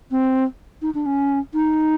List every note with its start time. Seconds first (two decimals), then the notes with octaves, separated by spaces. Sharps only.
0.11 C4
0.82 D#4
0.95 D4
1.06 C#4
1.54 D#4